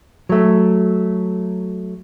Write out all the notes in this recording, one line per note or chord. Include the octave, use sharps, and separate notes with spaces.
F#3 A3